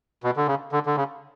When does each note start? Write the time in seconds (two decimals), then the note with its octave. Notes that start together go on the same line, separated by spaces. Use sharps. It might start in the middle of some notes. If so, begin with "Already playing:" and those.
0.23 B2
0.36 D3
0.48 C#3
0.72 D3
0.86 D3
0.96 C#3